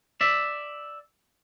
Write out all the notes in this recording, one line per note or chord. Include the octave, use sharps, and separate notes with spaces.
D5 E5